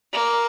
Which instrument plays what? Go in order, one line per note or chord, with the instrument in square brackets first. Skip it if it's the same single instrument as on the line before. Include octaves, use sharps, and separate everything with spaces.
[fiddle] A#3